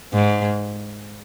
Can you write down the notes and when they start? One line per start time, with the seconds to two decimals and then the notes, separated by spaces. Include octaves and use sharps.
0.14 G#2